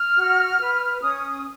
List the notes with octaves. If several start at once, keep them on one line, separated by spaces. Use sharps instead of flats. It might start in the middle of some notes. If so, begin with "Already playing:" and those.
Already playing: F6
F#4
B4
C#4 D#6